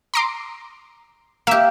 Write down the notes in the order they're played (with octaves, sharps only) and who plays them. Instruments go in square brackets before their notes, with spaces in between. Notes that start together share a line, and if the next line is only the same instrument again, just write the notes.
[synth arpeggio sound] A#5 C6 D6
[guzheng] A#3 G4 [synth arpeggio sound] E5